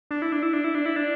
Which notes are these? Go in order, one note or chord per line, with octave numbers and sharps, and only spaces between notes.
D4
E4
D4
E4
D4
E4
D4
E4
D4